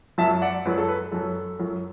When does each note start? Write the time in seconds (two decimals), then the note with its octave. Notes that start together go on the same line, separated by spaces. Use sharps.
0.18 F#2 F#3 E5 A5
0.42 D5 F#5
0.65 F#2 F#3 B4
0.78 A4
0.88 B4
1.12 F#2 F#3 A4
1.59 F#2 F#3